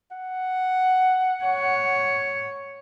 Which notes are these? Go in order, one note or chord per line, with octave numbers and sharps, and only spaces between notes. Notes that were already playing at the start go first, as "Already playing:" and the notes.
F#5
C#5